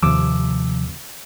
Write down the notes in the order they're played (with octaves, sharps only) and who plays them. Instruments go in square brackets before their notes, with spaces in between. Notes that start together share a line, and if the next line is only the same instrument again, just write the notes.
[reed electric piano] D#2 D6 E6 [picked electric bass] C3 F3